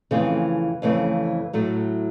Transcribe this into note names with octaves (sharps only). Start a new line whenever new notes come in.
F2 C#3 E3 A3 C4
F2 C#3 E3 A3 C4
A2 F#3 A3